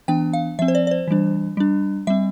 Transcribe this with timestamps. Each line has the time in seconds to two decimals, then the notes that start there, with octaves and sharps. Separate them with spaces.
0.08 E3 B3 D4 G5
0.33 F5
0.59 F3 C4 E5
0.68 C5
0.75 D5
0.87 D5
0.91 C5
1.08 E3 G3 D4
1.57 G3 D4
2.07 G3 C4 E5